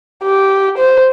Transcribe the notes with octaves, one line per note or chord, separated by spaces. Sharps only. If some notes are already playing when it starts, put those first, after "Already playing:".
G4
C5